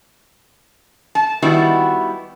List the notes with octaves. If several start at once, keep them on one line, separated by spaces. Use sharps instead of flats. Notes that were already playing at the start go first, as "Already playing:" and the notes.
A5
D#3 G3 B3 E4 F#4